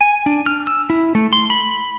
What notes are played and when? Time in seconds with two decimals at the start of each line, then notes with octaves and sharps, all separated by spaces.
0.01 G#5
0.26 D4
0.46 F6
0.67 E6
0.90 E4
1.15 A3
1.33 C6
1.50 B5